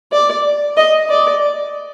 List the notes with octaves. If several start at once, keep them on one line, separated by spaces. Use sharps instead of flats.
D5
D#5
D5